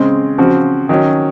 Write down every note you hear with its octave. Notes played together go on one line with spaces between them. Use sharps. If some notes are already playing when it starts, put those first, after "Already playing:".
Already playing: C#3 G#3 C4
C#3 F3 C4 F#4
D#3 F#3 C#4